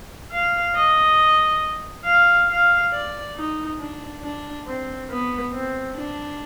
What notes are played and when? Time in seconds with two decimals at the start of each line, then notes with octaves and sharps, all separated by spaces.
0.32 F5
0.75 D#5
2.05 F5
2.49 F5
2.92 D5
3.36 D#4
3.79 D4
4.22 D4
4.65 C4
5.09 B3
5.52 C4
5.96 D4